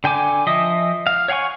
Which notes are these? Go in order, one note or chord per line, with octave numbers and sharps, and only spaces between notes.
D3 G5 G#5 D6
F3 D#5 E5 D#6
F5
C#5 F5 F#5 G#5 C#6